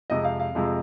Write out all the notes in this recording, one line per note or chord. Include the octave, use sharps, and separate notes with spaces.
F2 C3 F3 G#3 D#5
F5
F5
F2 C3 F3 G#3